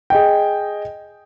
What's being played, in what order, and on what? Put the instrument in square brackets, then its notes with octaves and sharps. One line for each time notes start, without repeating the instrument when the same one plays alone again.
[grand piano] G#4 D#5 G5